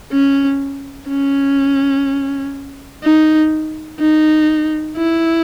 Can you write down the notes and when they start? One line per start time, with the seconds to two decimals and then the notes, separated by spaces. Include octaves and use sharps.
0.12 C#4
1.09 C#4
3.03 D#4
4.00 D#4
4.97 E4